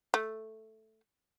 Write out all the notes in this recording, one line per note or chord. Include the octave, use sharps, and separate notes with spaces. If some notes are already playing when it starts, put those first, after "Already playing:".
A3